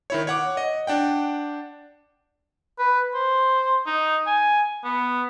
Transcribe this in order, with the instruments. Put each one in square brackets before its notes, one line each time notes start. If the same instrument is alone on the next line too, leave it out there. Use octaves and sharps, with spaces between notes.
[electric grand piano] D#3 E4 C#5
C#5 F#5 D6
D#5
D4 F#5 G5
[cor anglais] B4
C5
D#4
G#5
B3